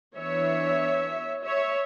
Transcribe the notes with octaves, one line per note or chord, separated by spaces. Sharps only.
E3 B3 D4 C#5 E5
C#5 E5